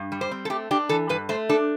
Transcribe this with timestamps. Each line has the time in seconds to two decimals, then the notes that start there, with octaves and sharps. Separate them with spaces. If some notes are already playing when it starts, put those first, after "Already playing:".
Already playing: G2
0.12 G3
0.21 C5
0.31 C4
0.45 A4
0.50 A3 G4
0.71 D4 G4
0.89 E3 A4
1.09 G2 B4
1.29 A3 C5
1.49 D4 A4